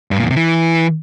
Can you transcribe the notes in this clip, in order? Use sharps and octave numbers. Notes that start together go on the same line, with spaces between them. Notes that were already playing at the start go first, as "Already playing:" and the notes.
G2
A#2
E2
C3
E3